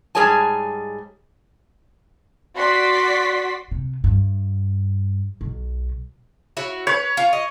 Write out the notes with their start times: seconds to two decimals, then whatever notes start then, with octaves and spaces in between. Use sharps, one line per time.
0.15 G#2 G3 G#4 C#5 G#5 A5
2.57 F#4 D5 C6 B6
3.71 C3
4.04 G2
5.41 B1
6.57 E4 F#4 C#5
6.87 B4 C#5
7.17 F4
7.33 D#5